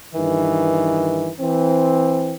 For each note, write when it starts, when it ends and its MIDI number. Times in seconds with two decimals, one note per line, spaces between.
0.15 1.31 43
0.15 1.31 51
0.15 1.31 52
1.41 2.36 52
1.41 2.36 60